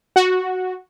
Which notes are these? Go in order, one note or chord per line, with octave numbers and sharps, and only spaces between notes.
F#4